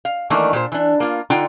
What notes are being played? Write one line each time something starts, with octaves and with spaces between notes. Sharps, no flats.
F5
D#3 E3 A3 A#3 D4 D#4
A#2 F#4 C5
E3 D4
A#3 F4
D3 D#4 F4 F#5 G5